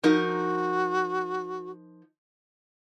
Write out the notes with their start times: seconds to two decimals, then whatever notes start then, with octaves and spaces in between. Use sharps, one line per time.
0.03 F3 D#4 F#4 A#4